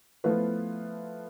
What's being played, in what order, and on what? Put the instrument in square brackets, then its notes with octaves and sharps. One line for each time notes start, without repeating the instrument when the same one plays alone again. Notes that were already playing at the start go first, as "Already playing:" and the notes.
[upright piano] F3 A3 B3 E4 F4 B4